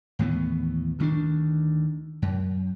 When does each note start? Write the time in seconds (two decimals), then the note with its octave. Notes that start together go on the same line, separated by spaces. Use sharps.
0.19 D#2 A2 E3 B3
0.99 D2 D#3 A3 D4
2.22 F#2